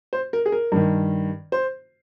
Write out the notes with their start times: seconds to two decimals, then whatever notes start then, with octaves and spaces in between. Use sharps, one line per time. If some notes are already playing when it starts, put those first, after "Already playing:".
0.13 C5
0.33 A#4
0.46 G#4
0.52 A#4
0.72 G2 D#3
1.52 C5